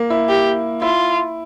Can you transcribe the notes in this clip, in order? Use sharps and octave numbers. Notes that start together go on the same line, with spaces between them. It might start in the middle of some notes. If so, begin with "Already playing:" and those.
Already playing: A#3
E4
G4
E4 F4